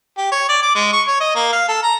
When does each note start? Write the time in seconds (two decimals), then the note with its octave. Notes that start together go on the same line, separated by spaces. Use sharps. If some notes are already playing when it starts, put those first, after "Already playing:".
0.18 G4
0.32 C#5
0.49 D5
0.63 D6
0.75 G#3
0.93 C#6
1.07 C#5
1.21 D#5
1.35 A#3
1.53 F5
1.68 A4
1.83 A#5